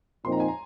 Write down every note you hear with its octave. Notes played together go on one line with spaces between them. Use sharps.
A#2 F3 C4 D#4 C6
A#5
G#5
A#5